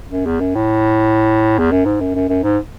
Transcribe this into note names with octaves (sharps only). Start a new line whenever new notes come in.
F#2
E2
F#2
A2
E2
F#2
G#2
F#2
F#2
F#2
G#2